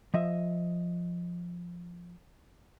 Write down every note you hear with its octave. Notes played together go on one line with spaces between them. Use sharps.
F3 D#5 E5